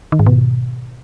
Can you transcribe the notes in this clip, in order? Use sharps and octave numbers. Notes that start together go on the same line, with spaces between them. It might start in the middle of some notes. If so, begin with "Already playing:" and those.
D#3
G#2
B2